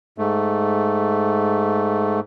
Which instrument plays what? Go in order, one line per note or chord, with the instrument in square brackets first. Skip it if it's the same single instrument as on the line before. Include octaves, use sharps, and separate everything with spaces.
[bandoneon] G#2 A3